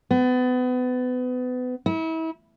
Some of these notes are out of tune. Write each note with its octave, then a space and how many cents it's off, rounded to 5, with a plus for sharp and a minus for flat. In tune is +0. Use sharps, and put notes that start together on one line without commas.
B3 +30
E4 -35